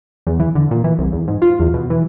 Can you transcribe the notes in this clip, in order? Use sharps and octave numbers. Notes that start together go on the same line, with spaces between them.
E2
E3
D3
A#2
E3
C2
E2
G#2
F4
E2
B2
E3